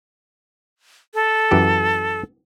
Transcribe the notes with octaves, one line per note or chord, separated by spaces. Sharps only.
A4
F#2 E3 G4